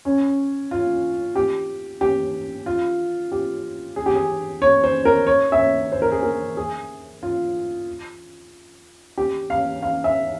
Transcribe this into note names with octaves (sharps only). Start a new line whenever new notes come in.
C#4
F4
G4
G4
F4
G4
G#4
G4
G#4
C#5
C5
A#4
C#5
E5
C#5
C5
A#4
G#4
A#4
G#4
F4
G4
F5
F5
E5